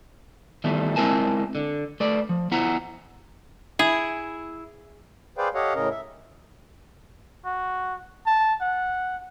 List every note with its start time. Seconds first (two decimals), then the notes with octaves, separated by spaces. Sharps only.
0.64 D#3 E3 G3 A3 B3
0.96 G#3 C4 E4 A#4 G#5 A5
1.55 D3
2.00 A3 B4 D5
2.29 F3
2.51 B3 E4 F#5 A#5
3.79 E4 G#4
5.38 G#4 B4 C5 D5 F5 G5
5.55 G4 A4 C#5 D#5 F5 F#5
5.75 A2 C#3 C#4 A#4 D#5
5.91 E5
7.45 F#4
8.26 A5
8.61 F#5